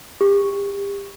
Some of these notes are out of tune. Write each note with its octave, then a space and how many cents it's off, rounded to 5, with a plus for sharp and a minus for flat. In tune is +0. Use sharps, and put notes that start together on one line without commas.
G4 +30